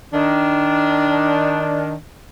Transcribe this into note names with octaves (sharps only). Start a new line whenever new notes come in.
D#3 D4